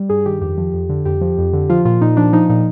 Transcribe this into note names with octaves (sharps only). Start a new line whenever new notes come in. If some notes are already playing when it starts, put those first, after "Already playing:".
Already playing: G3
G2 G#4
D#3 G4
F2 G4
F3
F2
D3
F2 G4
F3
F2
D3
F3 F4
A#2 F4
A#2 D#4
F3 D4
F3 D#4
A#2 D#4